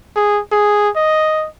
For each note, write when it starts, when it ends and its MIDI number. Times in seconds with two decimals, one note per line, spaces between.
0.16 0.40 68
0.52 0.89 68
0.96 1.47 75